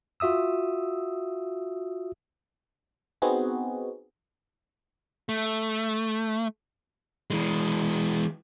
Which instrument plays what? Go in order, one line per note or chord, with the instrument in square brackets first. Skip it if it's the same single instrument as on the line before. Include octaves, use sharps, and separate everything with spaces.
[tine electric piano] F4 F#4 E5 D#6 E6
[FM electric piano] B3 C4 D#4 F#4 G#4
[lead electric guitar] A3
E3 G#3